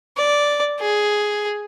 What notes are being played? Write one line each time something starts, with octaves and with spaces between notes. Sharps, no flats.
D5
G#4